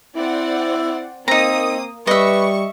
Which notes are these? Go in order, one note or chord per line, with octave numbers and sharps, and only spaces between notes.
C4 E4 D5 F#5
A#3 C4 D#4 A#5 D#6
G3 B4 D#5 E5 C#6